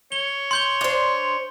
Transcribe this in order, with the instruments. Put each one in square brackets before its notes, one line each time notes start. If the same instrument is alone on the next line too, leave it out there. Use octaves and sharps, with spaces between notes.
[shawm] C#5 [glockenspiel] G7
[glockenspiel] C6 G6 G7
[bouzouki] D4 C5